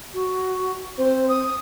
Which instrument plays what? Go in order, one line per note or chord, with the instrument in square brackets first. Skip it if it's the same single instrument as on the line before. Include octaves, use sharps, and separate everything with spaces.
[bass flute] F#4
[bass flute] C4 [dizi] C5
[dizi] D#6